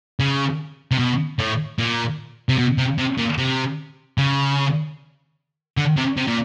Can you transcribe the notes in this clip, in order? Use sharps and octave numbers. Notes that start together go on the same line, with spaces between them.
C#3
C3
B2
A2
A#2
C3
B2
C3
C3
A#2
C3
C#3
D3
C3
C3
A#2